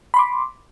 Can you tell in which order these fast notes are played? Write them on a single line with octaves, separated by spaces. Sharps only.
B5 C6 D6